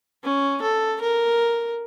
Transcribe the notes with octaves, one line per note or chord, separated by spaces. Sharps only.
C#4
A4
A#4